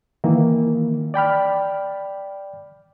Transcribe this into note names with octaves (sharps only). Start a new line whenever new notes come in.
D#3 E3 A#3
D5 G5 B5 F6